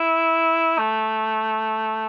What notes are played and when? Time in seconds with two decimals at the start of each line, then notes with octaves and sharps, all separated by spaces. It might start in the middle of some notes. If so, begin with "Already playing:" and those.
Already playing: E4
0.78 A3